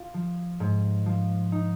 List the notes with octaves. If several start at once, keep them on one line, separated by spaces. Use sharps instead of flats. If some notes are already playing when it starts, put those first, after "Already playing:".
Already playing: F4
F3
G#2
F3
D#4